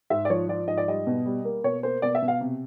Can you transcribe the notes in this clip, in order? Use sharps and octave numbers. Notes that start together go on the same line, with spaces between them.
G#2 E5
D5
F3 C#5
F3 D5
G#2 D#5
D5
G3 D#5
B2
G3
A#3
B2 C#5
A#3 C5
B2 D5
E5
B2
F5
C3